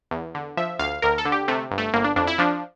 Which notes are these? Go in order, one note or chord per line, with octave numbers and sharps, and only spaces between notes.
E2
D3
F3 E5
D2 F5
D2 A#4
A4
D3
G4
C3 A3
G1
A3
G1 A#3
D4
F2 D4
E4
F3 D4